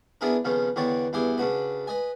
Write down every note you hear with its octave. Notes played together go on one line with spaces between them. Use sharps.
B3 D4 E4 G#4 A#4 B4
F2 C#3 B3 C#4
E2 D3 B3 C#5 D5 G5
E2 G2 E4 G#4 C6 D6
C#3 D4 F#4 B4
B4 D#5 G#5